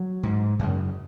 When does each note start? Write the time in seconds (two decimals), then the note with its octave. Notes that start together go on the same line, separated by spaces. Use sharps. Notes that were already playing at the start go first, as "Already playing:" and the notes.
Already playing: F#3
0.23 G#2
0.59 F#2 C#3